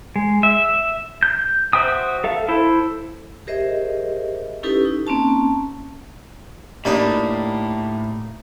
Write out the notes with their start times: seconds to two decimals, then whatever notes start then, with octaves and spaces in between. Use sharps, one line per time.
0.16 G#3
0.43 E5
1.23 G6
1.73 F#4 C5 E5 G5 D#6
2.24 A4 E5 F5
2.48 E4 A4 C5
3.47 G4 G#4 A#4 C5 D#5 E5
4.63 C#4 D#4 E4 G4 A4 B4
4.85 D#4
5.07 A#3 C4 C#4 A5
6.85 A2 G3 A#3 D4 D#4